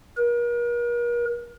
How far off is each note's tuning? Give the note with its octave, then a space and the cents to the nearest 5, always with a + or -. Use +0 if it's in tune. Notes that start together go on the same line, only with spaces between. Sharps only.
A#4 +40